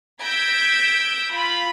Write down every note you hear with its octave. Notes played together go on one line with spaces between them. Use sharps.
E6 G6 G#6 A#6 B6 D7
F4 B5